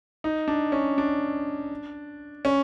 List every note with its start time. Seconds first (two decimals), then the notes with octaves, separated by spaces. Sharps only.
0.24 D#4
0.48 D4
0.72 C#4
0.98 D4
2.45 C#4